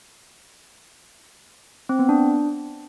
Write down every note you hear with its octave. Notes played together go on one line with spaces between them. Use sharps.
C4
B3
D4